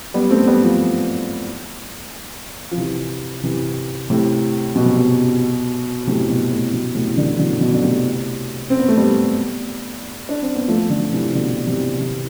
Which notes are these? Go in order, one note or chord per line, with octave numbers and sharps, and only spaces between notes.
G3 B3
A3 C4
G3 B3
F3 A3
F3
C3 E3
C3 E3
A2 C3
B2
C3
B2
A2 C3
B2
A2
B2
A2 C3
E3
B2 D3
E3
B2 D3
B2 D3
D3
A2 C3
C4
B3
A3
G3 B3
D4
C4
B3
F3 A3
D3 F3
C3 E3
E3
B2 D3
C3 E3
C3 E3
E3